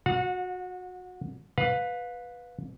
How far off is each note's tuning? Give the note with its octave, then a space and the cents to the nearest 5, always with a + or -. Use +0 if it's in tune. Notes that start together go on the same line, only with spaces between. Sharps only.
F#4 -25 F#5 -45
B4 +0 F5 +30